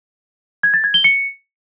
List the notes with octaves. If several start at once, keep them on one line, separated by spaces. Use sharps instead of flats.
G#6
A6
G#6
G7
C#7